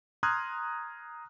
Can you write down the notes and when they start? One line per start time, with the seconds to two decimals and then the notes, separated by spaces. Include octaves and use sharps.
0.23 A#5 C6 D#6 F6 F#6 G#6